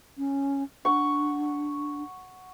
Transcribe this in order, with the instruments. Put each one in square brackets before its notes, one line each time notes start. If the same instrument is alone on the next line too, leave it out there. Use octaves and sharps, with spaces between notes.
[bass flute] C#4
[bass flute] D4 [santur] F#5 C#6